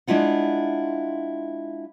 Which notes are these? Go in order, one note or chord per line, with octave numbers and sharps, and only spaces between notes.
G#3 D4 E4 F4 F#5